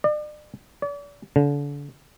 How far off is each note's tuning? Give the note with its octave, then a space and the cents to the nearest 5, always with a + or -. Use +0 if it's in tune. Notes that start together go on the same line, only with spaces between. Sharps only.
D5 +40
D5 -40
D3 -35